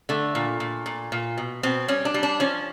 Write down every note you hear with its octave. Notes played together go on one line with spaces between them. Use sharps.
D3 A3
A#2
A#2
A#2
A#2
B2
B2 C4
G3 C#4
D4
G3
D4
F3 C#4